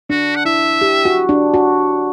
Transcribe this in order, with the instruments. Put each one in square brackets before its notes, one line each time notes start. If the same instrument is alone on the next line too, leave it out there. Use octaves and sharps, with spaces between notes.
[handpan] D4 [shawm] F#4
[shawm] F#5
[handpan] E4 [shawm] E5
[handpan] G4
F#4
D4
F#4